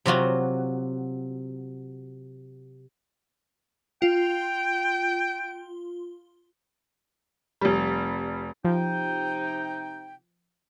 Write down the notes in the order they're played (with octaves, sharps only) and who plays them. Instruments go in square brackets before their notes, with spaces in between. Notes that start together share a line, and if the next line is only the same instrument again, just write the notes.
[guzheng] C3 F#3 F4 F#4
[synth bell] F4 [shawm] G5
[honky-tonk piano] F1 G3
[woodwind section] C3 D#4 G5 [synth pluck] F3